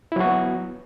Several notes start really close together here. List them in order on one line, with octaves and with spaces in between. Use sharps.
E4 F#3 F#4 B3